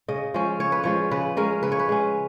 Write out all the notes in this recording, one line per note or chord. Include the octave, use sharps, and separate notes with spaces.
C#3 D#5
F3 G#3 C#4
C#3 C#5
B4
F3 G#3 C#4 C#5
C#3 B4
G#3 C#4 A#4
C#3 B4
C#5
B4
G#3 C#4